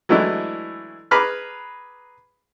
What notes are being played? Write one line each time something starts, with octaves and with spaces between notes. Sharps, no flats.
E3 F#3 G#3 A3 D4 E4
G#4 B4 A#5 B5 D6 F6